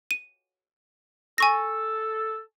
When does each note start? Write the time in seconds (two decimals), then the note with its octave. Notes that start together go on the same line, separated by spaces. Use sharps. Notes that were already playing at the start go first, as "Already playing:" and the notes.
0.11 D#7
1.38 A4 G#5 C#6 A#6